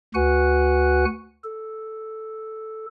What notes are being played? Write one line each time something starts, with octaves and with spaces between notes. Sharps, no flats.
D2 F#4 B4 F#5 G#5 F#6
A4